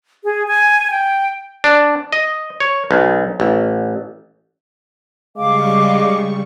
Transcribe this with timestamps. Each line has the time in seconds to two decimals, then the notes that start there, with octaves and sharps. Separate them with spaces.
0.24 G#4
0.48 G#5
0.91 G5
1.64 D4
2.12 D#5
2.60 C#5
2.91 B1
3.40 A1
5.37 C#3 G3 G#3 F5 C#6 D6